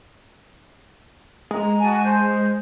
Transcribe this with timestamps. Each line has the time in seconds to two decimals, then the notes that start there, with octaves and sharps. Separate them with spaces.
1.51 G#3 A#5
1.81 F#4 G#5 A5
2.04 C5